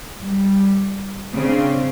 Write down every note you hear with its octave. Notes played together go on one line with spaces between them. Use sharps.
G3
C#3 C4 D4